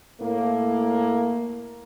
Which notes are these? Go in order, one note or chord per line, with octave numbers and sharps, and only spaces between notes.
A2 A#3